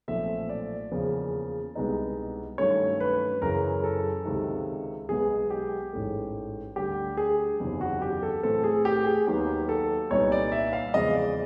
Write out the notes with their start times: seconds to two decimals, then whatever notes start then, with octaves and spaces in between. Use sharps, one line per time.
0.08 B1 A#2 F3 A3 C4 E5
0.49 D5
0.91 E2 C#3 F3 A#3
1.75 C2 B2 G#3 B3 D#4
2.58 G2 D#3 F#3 A3 C#4 C#5
3.00 B4
3.42 F#2 C#3 E3 A#4
3.84 A4
4.25 C#2 C3 D#3
5.09 B1 B2 G#3 B3 G#4
5.50 G4
5.93 A1 G#2 E3 A3
6.76 D2 D3 G3 G4
7.17 G#4
7.60 F#1 E2 C3 D#3
7.81 F#4
8.02 G4
8.23 A4
8.43 A2 E3 A3 C4 A4
8.64 G#4
8.85 G4
9.06 G#4
9.27 D#2 D#3 F#3 B3 G4
9.69 A4
10.10 C2 A#2 G3 B3 D#4 C#5
10.32 D5
10.52 E5
10.73 F5
10.94 E2 C#3 F3 G#3 C4 D#5
11.15 D5